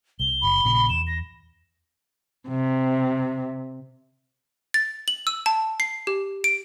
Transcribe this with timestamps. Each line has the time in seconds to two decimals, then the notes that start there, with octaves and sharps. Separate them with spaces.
0.20 C2 G7
0.42 F#1 B5
0.64 A#1 A#2 C#3
0.89 E2 E7
1.07 A#6
2.49 C3
4.74 A6
5.08 F#7
5.27 E6
5.46 A5
5.80 C7
6.07 G4
6.44 D7